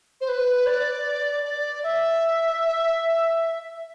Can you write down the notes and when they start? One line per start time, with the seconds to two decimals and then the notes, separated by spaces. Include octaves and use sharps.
0.20 C5
0.28 B4
0.66 D5
1.44 D5
1.83 E5